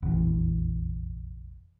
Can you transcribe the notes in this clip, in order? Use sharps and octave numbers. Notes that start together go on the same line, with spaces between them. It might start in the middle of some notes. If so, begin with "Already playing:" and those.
F1 A#1 E2 E3